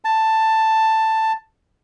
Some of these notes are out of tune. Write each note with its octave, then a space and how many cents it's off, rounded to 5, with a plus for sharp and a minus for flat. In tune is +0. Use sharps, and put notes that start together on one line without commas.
A5 +10